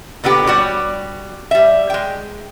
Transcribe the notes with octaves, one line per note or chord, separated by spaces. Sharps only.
A#2 D3 B3 G4
G3 F#4 G4 C#5
G3 E5
G#3 G5